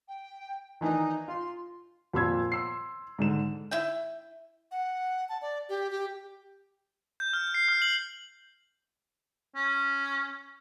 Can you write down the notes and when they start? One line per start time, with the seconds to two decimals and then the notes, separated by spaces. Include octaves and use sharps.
0.08 G5
0.81 D#3 E3 D4 D#4
1.28 F4 C6
2.13 F2 A#2 B5 C6 E6 G#6
2.52 C6 E6 C7
3.19 G#2 D3 E7
3.71 E4 E5 G5
4.71 F#5
5.29 A5
5.42 D5
5.69 G4
5.90 G4
7.20 G6
7.33 F6
7.54 C7
7.68 F6
7.82 F#7
9.56 C#4